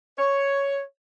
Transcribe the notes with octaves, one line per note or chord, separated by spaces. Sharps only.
C#5